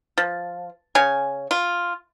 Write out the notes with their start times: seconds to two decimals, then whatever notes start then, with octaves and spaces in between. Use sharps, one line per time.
0.18 F3
0.95 C#3 C#5 G#5
1.51 F4